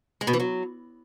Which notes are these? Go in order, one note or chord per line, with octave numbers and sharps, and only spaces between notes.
G#3
B2
E3
F#3